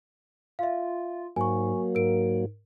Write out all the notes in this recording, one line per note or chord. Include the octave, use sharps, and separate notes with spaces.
F4 E5 F5
G#2 F#3 A#3 G#5 C#6
G#2 A#4 D7